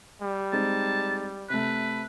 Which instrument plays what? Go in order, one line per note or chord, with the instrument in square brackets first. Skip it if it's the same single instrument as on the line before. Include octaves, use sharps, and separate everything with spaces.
[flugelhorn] G3
[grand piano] G#3 C4 D#4 [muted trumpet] A5
[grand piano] C3 A3 [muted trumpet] B4